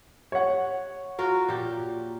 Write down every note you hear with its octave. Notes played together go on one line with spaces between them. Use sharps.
C#5 F#5
F4 F#4 A#4
A#2 G4